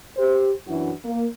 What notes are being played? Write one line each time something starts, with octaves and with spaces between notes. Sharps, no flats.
G4 C5
F#2 E3 D4 E4 F#4
A#3